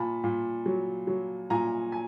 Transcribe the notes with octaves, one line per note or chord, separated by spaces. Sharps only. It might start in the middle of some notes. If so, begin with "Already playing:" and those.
Already playing: A#2 A5 B5
A#2
F#3
F#3
A#2 G#5 A#5
G#5